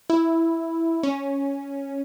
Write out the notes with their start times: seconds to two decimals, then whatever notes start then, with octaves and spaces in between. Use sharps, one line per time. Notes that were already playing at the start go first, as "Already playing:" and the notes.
0.10 E4
1.03 C#4